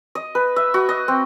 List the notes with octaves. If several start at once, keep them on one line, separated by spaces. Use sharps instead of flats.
D#5
B4
E5
F#4
D#5
C4